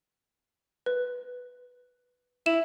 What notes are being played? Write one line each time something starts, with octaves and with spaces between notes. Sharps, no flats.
B4
E4 E7